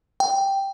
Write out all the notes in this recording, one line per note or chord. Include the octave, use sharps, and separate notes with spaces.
G5